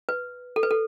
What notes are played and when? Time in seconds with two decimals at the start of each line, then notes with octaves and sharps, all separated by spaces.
0.09 B4
0.56 A4
0.63 B4
0.71 A4